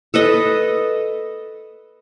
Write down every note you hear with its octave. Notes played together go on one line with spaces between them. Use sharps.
A4 B4 D#5